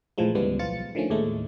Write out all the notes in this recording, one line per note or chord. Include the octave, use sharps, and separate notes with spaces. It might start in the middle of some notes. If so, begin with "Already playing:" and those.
A#1 A2 E3 F3 G#3
D2 G#2 C#3 E3 G3 B3
B1 F3 F4 A6 C#7
D3 D#3 F3 A3 C#4
D#2 A2 G#3 A3